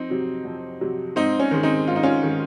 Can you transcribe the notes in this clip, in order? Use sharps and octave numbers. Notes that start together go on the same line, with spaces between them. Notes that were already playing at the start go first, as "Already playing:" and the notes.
Already playing: F2 C4 D#4
C3 F#3
F2
C3 F#3
G#2 C4 D#4
C#4
D#3 G#3
C4 D#4
G#2 F4
D#4
C#4 F4
D#3 G#3